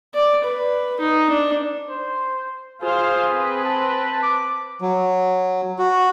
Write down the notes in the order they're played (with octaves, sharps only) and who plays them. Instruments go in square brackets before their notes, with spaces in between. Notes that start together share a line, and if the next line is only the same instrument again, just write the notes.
[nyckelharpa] D5
B4
D#4
D4
[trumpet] C5
[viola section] F4 C5 F5 [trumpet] G#4
[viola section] C4 B4
[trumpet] A5
D6
[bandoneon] F#3
F#4